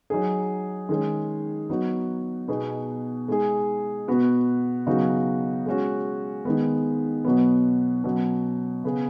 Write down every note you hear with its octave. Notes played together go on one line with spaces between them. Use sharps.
F#3 D#4 G#4
D#3 G#3 C#4 G#4
F#3 B3 D#4 F#4
B2 B3 D#4 G#4
G#3 D#4 G#4
B2 B3 F#4
C#3 F#3 B3 D#4 F#4
G#3 C#4 F#4
D#3 G#3 B3
B2 F#3 B3
B2 F#3 C#4
C#3 B3 G#4